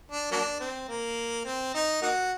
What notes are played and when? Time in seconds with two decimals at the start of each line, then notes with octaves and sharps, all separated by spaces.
0.12 D4
0.31 F#3 A#3 D4
0.60 C4
0.88 A#3
1.45 C4
1.74 D#4
2.02 A#3 D#4 F#4